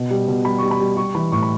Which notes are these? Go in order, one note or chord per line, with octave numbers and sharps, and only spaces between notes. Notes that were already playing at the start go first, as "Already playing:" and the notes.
Already playing: B2
G3
B2
G3 B5
G3 C#6
B5
G3
G3 C#6
E3 B5
A2 C#6
B5